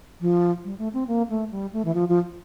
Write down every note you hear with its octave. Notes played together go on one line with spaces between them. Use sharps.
F3
G3
A3
C4
A#3
A3
G3
A3
E3
F3
F3